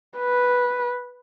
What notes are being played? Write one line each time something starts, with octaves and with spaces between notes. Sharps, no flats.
B4